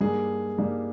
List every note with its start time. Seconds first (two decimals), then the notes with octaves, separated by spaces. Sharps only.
0.01 G2 G3 A#3 D#4 G#4
0.58 G2 G3 A#3 D#4